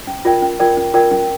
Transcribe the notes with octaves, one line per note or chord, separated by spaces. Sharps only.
C#4
F4 A#4 D5 G5
C#4
F4 A#4 D5 G5
C#4
F4 A#4 D5 G5
C#4